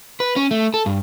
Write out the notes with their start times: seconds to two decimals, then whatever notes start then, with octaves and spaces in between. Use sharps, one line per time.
0.20 B4
0.36 C#4
0.51 A3
0.74 A4
0.86 G2